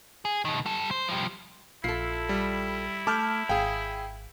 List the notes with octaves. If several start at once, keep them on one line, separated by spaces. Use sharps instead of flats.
G#4
B2 D#3
G3 A4
C5
F3 G3
A#1 E4 F4 A4 C7
G3
A3 A5 D6 F6 G6
G#1 G#4 F5 G5